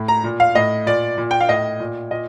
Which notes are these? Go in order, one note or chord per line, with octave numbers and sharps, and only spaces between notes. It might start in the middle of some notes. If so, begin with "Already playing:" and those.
Already playing: A2
A#5
A#2
F5
A2 D#5
A#2 D5
A#2
G5
F5
A2 D#5
A#2
A#2 D#5